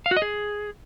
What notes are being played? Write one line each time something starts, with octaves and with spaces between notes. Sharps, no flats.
F5
F#4
D#5
G#4